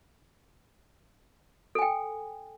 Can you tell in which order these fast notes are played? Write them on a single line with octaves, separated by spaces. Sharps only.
A4 G#5 G5